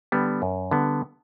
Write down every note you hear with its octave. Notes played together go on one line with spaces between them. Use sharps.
D3 G3 B3
F#2
D3 G3 B3